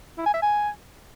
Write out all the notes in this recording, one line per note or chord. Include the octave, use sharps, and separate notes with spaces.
E4
G#5
E5
G#5